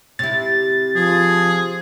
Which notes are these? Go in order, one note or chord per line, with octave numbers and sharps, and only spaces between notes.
C3 E4 A6
F3 G#4